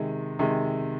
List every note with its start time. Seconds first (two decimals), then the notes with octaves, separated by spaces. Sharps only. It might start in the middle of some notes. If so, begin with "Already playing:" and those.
Already playing: C3 D#3 G#3
0.39 C3 D#3 G#3